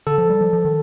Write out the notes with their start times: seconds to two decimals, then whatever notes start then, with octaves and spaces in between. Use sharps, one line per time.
0.07 D3 A4
0.18 F3
0.30 G3
0.41 F3
0.53 F3
0.65 D#3